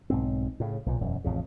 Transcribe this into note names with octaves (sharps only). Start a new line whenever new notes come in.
B1 G#2 C4
A2 C#3
B1 A#2
E1 F#2
A1 F2 C#3